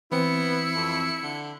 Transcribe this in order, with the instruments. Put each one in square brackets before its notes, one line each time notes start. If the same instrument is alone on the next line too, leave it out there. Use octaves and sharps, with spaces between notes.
[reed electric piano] E3 C4 [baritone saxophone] B3 [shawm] E4 [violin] C#7
[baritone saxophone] F2
D3